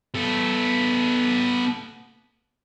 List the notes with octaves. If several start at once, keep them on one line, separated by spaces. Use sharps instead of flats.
B3 A4